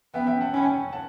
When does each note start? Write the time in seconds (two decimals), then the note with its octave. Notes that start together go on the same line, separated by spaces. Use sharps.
0.14 B3 E5 G5
0.27 E5 G5
0.41 F#5 A5
0.53 C#4 G5 B5
0.92 F#5 A5